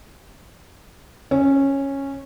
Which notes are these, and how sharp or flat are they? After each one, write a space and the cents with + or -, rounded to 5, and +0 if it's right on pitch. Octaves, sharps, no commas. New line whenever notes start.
C#4 -10